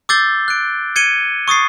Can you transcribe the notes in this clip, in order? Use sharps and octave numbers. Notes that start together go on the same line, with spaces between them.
D6 E6 G6 A6 C7 G7
F#6 D7
G#6 C#7 D#7 G7
C#6 D#6 A6 C7